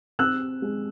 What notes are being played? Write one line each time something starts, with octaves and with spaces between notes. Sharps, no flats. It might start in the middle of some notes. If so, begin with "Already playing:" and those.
C4 E6 F#6
G#3